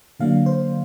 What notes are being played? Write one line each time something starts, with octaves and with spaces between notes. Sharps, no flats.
D3 F#3 A#3 D4 F5
C5